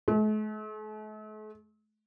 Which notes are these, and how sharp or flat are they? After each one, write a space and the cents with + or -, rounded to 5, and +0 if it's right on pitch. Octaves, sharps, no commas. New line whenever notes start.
A3 -45